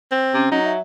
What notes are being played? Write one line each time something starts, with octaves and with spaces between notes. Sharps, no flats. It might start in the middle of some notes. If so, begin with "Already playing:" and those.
C4
C3 C#4
F#3 D#4
E5